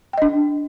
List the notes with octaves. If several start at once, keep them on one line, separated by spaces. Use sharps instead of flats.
D4 D#5 G5